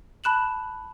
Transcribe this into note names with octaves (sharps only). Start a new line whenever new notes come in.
A5 B5 F#6 E7 F#7